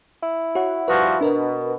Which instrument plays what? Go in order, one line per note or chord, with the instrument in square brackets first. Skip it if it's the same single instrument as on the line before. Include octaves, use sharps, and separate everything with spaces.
[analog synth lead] E4
[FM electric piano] F#4 C#5 F#5
[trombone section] G2 F3 F#4 [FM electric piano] B4
[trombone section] B2 [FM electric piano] D4 A#4 B4